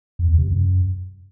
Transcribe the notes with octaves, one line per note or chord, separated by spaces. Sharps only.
F2
E2
C3
F#2